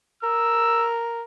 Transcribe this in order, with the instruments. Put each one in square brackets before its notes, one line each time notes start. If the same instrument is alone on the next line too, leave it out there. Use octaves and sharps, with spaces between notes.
[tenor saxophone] A#4 [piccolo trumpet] E6